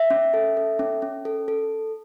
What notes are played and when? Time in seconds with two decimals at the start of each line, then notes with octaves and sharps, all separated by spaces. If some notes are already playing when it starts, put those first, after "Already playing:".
Already playing: E5
0.10 C#4
0.34 A4
0.57 A4
0.79 C#4
1.02 C#4
1.25 A4
1.48 A4